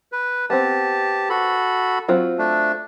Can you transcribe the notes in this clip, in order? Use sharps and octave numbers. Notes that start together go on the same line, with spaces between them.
B4
B3 C4 G4 A5
F#4 A4 B5
F#3 C4 F4
A3 D4